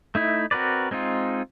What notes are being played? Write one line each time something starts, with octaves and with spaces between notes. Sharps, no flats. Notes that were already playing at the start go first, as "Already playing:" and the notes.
A3 D#4 E4
C4 F#4 A#4 B4 D5
G#3 C4 D#4 F4